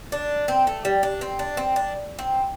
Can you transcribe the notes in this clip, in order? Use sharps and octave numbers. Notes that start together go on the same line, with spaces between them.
D4
C4
A3
G3
D4
C4
D4
C4
D4
C4